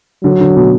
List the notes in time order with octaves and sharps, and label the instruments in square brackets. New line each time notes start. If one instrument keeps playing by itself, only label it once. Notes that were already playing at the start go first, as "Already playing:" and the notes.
[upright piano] D3 [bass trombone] F#3
[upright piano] D3
B2